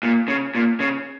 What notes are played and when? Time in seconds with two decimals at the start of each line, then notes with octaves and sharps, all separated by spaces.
0.03 A#2
0.28 C#3
0.55 A#2
0.80 C#3